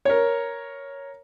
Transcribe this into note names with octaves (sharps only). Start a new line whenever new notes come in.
A#4 C#5